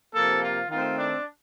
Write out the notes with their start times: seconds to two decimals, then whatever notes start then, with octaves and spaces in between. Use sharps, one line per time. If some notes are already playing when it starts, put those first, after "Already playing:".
0.13 C3 F3 A#3 A4
0.42 F4
0.70 D#3 A3 C4 F4
0.99 D4